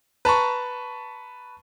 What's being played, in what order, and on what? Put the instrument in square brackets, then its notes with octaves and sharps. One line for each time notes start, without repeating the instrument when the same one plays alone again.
[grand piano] B4 A5 A#5 C#6